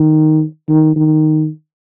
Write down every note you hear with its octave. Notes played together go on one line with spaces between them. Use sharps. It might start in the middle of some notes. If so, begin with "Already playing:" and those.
Already playing: D#3
D#3
D#3